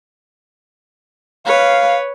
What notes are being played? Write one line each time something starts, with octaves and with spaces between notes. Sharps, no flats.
B4 C#5 F5